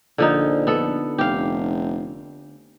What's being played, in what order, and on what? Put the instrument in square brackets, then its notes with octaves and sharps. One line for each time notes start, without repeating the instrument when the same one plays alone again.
[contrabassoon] A#1 [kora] D3 F3 D#4
[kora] B3 A4
[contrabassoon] F1 [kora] G4 F5